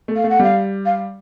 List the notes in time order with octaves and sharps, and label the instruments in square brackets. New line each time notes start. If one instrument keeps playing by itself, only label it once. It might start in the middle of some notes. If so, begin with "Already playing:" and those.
[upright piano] A3
[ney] F5
[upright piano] A3
[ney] F#5
[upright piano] G3 [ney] F5
[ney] F5